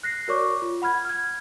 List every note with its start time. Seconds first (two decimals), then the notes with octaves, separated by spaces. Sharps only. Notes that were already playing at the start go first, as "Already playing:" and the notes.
0.03 F#6 A#6 C7
0.28 F#4 A#4 C#5 D5 C#6 D6
0.62 F4
0.82 F#5 B5 F6 G#6
1.05 F6 G#6